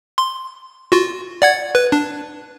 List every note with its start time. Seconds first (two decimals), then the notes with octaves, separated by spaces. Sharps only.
0.18 C6
0.92 F4 F#4
1.42 D5 F#5 G#6
1.75 B4
1.92 D4